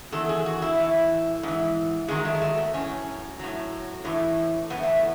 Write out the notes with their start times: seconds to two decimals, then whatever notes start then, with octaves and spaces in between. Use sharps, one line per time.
0.12 E2 D#3 F#3 A4
0.29 G#4
0.46 F#4
0.62 E4
0.78 A2 E3
1.43 G#2 E3
2.08 G#2 D#3 F#3 G#3
2.25 A3
2.35 G#3
2.41 A3
2.57 B3
2.74 A2 F#3 C#4
3.39 A2 F#3
4.05 A2 E3
4.70 A2 E3 B3
4.83 A3
4.97 B3